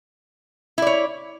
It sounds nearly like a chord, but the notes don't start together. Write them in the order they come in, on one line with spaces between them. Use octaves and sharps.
E4 D5 C#5